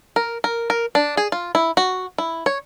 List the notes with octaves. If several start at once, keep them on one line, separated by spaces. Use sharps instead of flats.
A#4
A#4
A#4
D4
G#4
F4
E4
F#4
E4
C#5